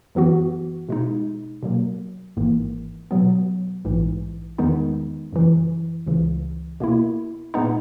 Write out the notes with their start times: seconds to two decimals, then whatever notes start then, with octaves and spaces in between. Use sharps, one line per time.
0.15 F#2 E3 B3 F#4
0.89 B2 G#3 D#4
1.63 B2 F#3 A#3
2.37 G#1 G#2 E3 A#3
3.11 B2 F#3 B3
3.85 A#1 G#2 E3
4.58 E2 D#3 G#3 B3 D#4
5.33 F#2 C#3 E3
6.07 C#2 C#3 E3
6.80 B2 A#3 E4
7.54 A#2 G#3 B3 D#4